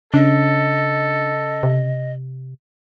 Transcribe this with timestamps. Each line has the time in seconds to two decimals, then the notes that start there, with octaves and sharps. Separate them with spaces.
0.14 C#3 D4 A4 D#5
1.63 C3